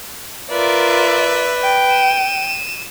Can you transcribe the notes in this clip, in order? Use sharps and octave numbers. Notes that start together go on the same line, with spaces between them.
F4 A#4 B4 D5 E5
G5
D#7 E7